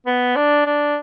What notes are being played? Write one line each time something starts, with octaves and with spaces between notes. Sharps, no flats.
B3
D4
D4